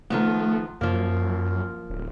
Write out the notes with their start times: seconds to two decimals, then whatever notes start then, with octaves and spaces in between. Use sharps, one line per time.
0.10 D#3 F3 A3 B3
0.81 F#2 F3 A#3
1.90 D1